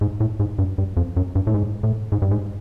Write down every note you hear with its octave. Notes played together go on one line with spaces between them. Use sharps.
G#2
A2
G#2
G2
G2
F2
F#2
G2
A2
G#2
A2
G#2
G2
G#2